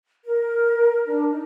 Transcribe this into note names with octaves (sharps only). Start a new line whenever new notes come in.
A#4
D4
D#4